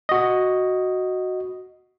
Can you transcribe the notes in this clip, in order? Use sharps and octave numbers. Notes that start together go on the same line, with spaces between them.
F#4 D#5